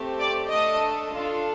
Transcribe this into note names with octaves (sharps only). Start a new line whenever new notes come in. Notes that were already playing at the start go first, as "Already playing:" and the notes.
Already playing: A3 C4 G4
D5 D6
A3 D4 A4 D#5 D#6
D4 F4 A4